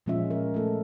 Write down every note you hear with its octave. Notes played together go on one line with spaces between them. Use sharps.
A#2 F3 G#3 C#4 F4 E5
A#4
A3 A4